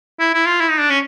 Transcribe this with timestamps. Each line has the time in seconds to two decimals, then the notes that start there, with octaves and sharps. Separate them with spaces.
0.20 E4
0.34 E4
0.47 F4
0.61 E4
0.70 D#4
0.80 D4
0.90 C#4